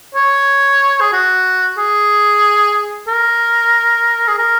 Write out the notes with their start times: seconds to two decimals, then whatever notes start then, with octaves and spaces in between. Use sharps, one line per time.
0.15 C#5
1.01 G#4
1.13 F#4
1.78 G#4
3.08 A#4
4.28 G#4
4.38 A#4